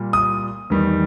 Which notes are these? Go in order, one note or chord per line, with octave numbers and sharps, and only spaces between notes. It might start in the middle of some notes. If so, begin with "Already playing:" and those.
Already playing: A#2 G3
D#6
E2 D#3 G3